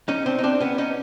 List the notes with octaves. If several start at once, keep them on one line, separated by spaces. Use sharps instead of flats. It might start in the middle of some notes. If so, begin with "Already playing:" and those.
C#4 D#4
C4 D4
D#4
C4 D4
B3 C#4
C#4 D#4